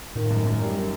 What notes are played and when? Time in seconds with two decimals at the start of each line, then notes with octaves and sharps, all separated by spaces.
0.15 A2 D#3
0.30 F#2
0.46 F#2
0.61 G3
0.76 D#3